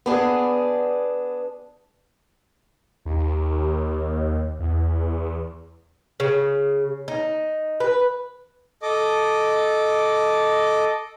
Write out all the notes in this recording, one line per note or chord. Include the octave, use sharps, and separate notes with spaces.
B3 D4 G#4
D#2
E2
C#3
D#4
B4
A4 D#5 D6